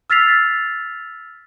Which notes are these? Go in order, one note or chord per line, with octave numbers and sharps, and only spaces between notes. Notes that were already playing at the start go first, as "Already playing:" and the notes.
E6 F6 A6 B6 C7 F7